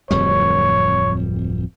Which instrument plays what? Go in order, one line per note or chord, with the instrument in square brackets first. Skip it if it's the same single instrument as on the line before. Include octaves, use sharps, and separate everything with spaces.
[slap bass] D1 F2 G3 [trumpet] C#5